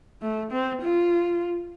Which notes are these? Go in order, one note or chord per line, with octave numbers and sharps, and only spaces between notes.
A3
C4
F4